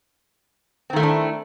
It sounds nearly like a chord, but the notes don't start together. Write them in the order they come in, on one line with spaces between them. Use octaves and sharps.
C4 D#3 A3 E4 D4